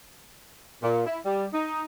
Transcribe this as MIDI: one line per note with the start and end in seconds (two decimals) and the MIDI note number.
0.83 1.06 46
1.06 1.19 64
1.26 1.47 55
1.53 1.84 63